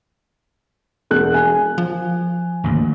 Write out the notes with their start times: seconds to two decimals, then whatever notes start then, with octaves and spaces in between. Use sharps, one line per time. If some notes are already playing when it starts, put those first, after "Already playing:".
1.11 E1 F#6
1.34 G#5
1.78 F3
2.64 G#1 D2 A#3